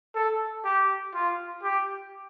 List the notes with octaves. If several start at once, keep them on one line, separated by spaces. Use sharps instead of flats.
A4
G4
F4
G4